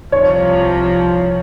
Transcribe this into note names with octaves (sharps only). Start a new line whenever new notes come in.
C2 C3 F3 C#5